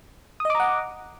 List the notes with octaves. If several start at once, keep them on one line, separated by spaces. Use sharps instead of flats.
D#5 F#5 A#5 D6 D#6